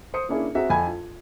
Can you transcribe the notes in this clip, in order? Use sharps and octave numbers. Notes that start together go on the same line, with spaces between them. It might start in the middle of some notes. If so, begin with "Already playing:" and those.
C5 D#6 C#7
A#3 C#4 D4 E4 G#4
C4 F#4 G#4 E5 A#5
F2 G#5 B5 G#6
F4